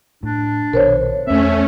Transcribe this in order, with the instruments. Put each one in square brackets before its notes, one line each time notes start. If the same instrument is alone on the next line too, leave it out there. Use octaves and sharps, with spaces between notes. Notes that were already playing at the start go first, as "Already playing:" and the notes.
[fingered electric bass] A2 [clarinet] D4
[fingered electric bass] A#1 B2 D#3 [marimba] A#4 C5 C#5
[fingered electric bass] E2 C4 [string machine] A3 C#4 [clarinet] E5